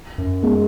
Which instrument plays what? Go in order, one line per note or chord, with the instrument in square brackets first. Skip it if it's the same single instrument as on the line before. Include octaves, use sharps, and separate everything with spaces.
[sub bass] F#2
[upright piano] G#3